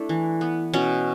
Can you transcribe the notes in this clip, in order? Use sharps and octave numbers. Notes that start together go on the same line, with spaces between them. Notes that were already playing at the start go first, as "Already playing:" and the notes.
Already playing: A3 D4 E4
E3
B3
B2 C#4